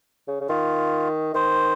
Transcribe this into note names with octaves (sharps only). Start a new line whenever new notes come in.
C#3
C#3
D#3 F4
D#3 C5